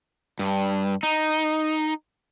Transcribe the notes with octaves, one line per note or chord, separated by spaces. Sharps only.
G2
D#4